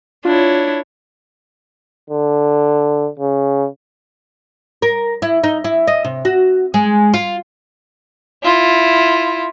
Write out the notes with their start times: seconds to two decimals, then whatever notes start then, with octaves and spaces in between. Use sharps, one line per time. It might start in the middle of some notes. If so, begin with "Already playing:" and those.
0.25 D4 E4 F4 C#5
2.10 D3
3.19 C#3
4.82 A#4
5.22 E4
5.44 D#4
5.64 E4
5.87 D#5
6.04 C3
6.25 F#4
6.74 G#3
7.14 F4
8.43 E4 F4